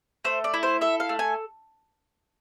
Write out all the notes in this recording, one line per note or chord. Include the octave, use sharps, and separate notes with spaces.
A3 C5
D5
E4
C5
A4 E5
F5
A3
G#5